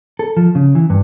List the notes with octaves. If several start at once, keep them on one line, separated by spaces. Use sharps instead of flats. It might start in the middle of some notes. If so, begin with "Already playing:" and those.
A4
F3
C#3
E3
G2